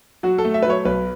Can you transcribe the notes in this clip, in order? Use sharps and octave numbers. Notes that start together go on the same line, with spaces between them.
F#3 F#4
A4
A3
E5
F#3 B4
C#5
B1 B4